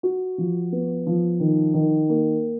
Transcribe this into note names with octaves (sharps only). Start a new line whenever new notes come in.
F#4
F3
B3
F3
D#3
D#3
A#3